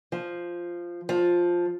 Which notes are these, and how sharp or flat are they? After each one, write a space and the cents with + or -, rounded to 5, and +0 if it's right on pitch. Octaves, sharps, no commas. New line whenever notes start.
F3 -5
F3 +5